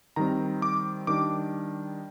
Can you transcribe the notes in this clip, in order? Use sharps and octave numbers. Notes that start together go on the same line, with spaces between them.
D#3 G3 C4 A#5
D6
D#3 G3 D4 D6